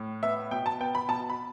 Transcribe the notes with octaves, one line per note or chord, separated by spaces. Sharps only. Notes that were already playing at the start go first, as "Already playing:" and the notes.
Already playing: A2
B3 E5
B2 G5
A5
B3 G5
B5
B2 A5
B5